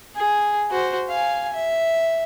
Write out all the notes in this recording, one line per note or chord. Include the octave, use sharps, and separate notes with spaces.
G#4
F#4 C5
F5 G#5
E5